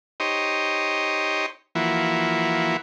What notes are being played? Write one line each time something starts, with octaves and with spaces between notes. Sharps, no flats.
D#4 G4 C5 C#5 D#5
E3 F3 A#3 E4 F#4